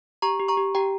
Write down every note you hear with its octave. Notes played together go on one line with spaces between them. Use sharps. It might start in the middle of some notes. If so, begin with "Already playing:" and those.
G4 A#5 C#6
G4
A#5 C#6
G4
G4 G5 A#5